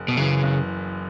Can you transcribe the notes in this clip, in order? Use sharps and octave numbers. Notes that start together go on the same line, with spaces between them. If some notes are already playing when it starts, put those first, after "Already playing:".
Already playing: F#1
B2
F#2 C#3 E3
F#1